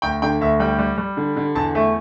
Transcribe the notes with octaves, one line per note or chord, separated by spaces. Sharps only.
D2 G5
D3 G5
D2 E5
G3 G5
G3
G3
D3
D3
E2 A5
A3 E5